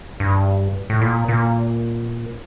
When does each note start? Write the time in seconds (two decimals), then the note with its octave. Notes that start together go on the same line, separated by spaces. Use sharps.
0.20 G2
0.90 A2
1.01 A#2
1.28 A#2